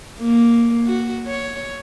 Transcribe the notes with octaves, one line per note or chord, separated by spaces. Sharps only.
A#3
F#4
C#5